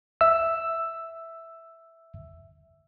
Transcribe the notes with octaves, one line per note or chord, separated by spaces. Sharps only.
E5 E6